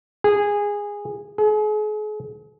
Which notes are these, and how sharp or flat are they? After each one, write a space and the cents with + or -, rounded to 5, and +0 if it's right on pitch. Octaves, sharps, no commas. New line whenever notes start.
G#4 -15
G#4 +40